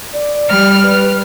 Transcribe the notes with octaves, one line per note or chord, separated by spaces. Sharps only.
D5
G3 F6
B4